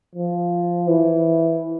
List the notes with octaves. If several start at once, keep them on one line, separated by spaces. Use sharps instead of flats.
F3
E3